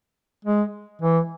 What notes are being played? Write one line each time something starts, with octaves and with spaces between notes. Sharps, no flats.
G#3
E3